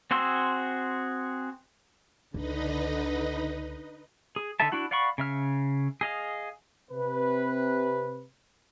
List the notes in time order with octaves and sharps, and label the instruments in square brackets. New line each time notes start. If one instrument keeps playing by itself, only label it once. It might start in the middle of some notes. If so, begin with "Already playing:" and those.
[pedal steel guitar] C4 F#4 G#4 C6 E6
[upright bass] C#2 [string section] D3 [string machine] D#4 B4 D#5
[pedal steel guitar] G#4
D3 D#4 A4 E5 A5
D4 E4 F#4 F#5
D5 F5 F#5 B5 C#6
C#3 E5 F6
G#4 D#5 F5
[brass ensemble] C3 B4